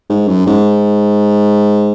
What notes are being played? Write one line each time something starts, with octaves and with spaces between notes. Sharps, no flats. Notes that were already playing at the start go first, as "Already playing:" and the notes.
G#2
F#2
G#2